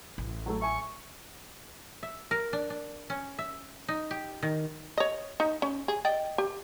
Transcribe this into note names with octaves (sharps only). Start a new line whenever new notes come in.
A1
F#3 A3 A4
E5 G#5 C#6
E5
A#4
D4
D4
C#4
E5
D#4
G4
D#3
C#5 D#5
D#4
C#4
G#4
D5 D#5 G5
G4